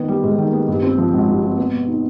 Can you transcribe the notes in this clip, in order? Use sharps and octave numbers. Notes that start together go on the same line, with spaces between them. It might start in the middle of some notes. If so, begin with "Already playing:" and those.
Already playing: D#3 B3
G3
G#2
D#3
B3
G2
C4
F3
G#1
G2
C4
B3
B2
D#4